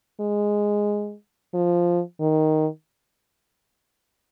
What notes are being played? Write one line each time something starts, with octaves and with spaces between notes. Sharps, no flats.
G#3
F3
D#3